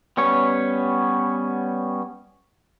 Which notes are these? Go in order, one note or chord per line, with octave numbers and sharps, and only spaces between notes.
G3 B3 C#4 C#5